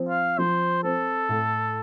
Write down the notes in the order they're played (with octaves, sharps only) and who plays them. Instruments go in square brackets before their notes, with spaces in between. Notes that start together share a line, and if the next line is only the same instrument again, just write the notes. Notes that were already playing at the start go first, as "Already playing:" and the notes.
Already playing: [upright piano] F3 C4
[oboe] F5
[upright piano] F3 [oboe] C5
[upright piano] C4 [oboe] A4
[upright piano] A2